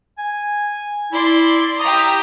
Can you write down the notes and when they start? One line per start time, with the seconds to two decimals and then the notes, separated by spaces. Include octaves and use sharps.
0.18 G#5
1.13 E4 D5 C6
1.80 G4 E5 A#5 D#6